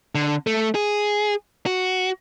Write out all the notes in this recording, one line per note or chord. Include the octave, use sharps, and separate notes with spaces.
D3
A3
G#4
F#4